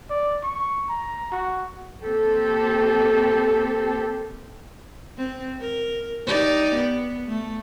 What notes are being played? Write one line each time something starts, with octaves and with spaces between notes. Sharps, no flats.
D5
C#6
A#5
F#4
A#3 C4 G4 A4
C4
A#4
D#4 G4 D5
B3
A3